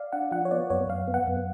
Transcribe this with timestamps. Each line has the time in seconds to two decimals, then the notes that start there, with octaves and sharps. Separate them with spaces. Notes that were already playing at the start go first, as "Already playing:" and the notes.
Already playing: D5 F5
0.12 D4 F#5
0.31 F3 F#5
0.45 C#5
0.51 B3 D5
0.70 F#2 C#5
0.89 F#2 F5
1.08 B3
1.14 F#5
1.27 F#2